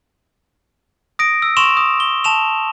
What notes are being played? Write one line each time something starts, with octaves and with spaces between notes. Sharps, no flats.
D#6 A#6 D7
E6
C6 C#6 E7 F7
D#6
G7
A5 E7 F7